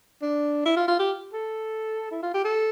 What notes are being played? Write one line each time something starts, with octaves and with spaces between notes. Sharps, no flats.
D4
E4
F4
F4
G4
A4
E4
F4
G4
A4